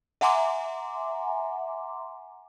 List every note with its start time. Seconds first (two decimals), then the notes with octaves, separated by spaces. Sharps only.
0.21 E5 F#5 G#5 A#5 C6 D6